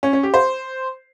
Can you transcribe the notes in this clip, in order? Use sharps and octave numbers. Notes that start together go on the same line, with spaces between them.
C#4
C#4
G4
C5